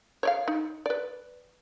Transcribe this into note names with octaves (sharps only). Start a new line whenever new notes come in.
C#5 D5 F5
D#4
B4 D5